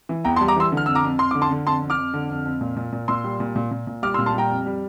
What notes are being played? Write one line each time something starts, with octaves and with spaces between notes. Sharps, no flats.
E3
E2 G5 A#5
A5 C6
G3
A#5 D6
E3 C6 E6
D3
F6
F2 E6
A#5 D6
F2
F2 C6
D3 D6
A5 C6
D3
F2 A5 C6
F2
D6 F6
F2
D3
F2
F2
A#2
A#2
A#2
A#2 C6 E6
G3
A#2
A#2
A#2
A#2
G3 D6 F6
C6 E6
A#2
A5 C6
G3 G5 A#5
F2
G3